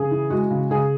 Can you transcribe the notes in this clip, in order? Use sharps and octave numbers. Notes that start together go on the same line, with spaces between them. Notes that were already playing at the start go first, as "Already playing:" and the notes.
Already playing: C#3 G#4
E3
G#3 F#4
C#3
C#3 G#4